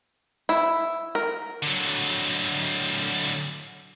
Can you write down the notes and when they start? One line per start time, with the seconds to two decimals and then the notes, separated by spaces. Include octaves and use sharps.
0.49 E4
1.15 A#4
1.63 D3 F#3